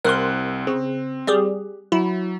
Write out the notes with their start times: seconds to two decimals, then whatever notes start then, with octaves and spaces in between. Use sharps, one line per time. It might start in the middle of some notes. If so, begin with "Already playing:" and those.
0.05 C2 C4 A#4 C6 F#6
0.67 C#3 C4
1.27 G3 G4 G#4
1.92 F#3 E4